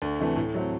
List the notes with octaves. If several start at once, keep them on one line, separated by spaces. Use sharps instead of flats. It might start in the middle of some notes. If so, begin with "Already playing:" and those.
D2
C3 E3 A3
A2
F#3 A3 C4